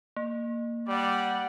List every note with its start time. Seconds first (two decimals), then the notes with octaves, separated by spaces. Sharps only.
0.16 A#3
0.88 G3 D5 F#5